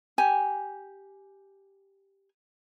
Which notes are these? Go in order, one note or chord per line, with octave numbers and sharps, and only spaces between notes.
G4 G#5